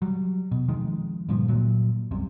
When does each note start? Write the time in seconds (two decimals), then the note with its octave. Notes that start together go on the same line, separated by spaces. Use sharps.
0.02 F#3 G3
0.52 B2
0.68 F2 D#3 G#3
1.29 G2 A#2 D3 F3
1.48 A#2 F#3
2.11 C2 F#2 C3